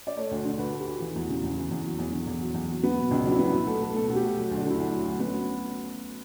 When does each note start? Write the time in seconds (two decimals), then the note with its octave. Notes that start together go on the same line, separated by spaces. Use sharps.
0.07 D5
0.17 A3 C#5
0.31 D2
0.45 D3
0.58 D2 B4
0.72 A3
0.80 G4
0.87 D2
1.00 E3 F#4
1.15 E2
1.22 F#4
1.29 C#3
1.43 E2
1.57 E3
1.71 E2
1.85 F#3
1.98 E2
2.12 D3
2.27 E2 F#4
2.41 F#3
2.54 E2
2.69 F#3
2.83 B3
2.96 B2
3.11 C#2 D4
3.25 F#3 D4
3.32 E4
3.39 B3
3.52 B2 F#4
3.67 A3
3.81 A3
3.95 B2 A4
4.09 B2 F#4
4.16 G4
4.23 A3
4.36 F#3 F#4
4.50 D2
4.57 D4
4.65 D3
4.70 E4
4.78 D2 D4
4.93 F#3
5.07 D2
5.20 B3 C#4